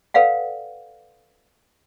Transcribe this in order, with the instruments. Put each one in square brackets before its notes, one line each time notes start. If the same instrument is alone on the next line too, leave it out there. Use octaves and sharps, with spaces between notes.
[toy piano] A4 B4 D5 F5 F#5